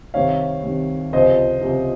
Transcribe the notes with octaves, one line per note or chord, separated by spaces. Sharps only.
C2 C3 D#3 C#5 F5
C2 C3 D#3
C#2 C3 F3 C5 D#5
C#2 C3 F3